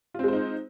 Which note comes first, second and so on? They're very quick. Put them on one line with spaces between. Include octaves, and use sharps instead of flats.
F4 C4 G#3 C5 D#4